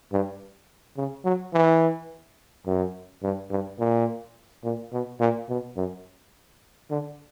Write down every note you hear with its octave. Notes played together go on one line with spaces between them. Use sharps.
G2
C#3
F#3
E3
F#2
G2
G2
A#2
A#2
B2
A#2
B2
F#2
D3